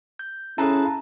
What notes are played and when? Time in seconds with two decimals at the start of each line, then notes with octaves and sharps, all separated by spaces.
0.19 G6
0.58 C#4 E4 G#4 A4 B4 F5 A5 A#5